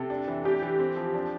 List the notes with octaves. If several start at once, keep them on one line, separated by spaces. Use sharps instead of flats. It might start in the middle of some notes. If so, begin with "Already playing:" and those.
Already playing: C3 A4
D4
E3
D4 G4
E3
C4
F3
D4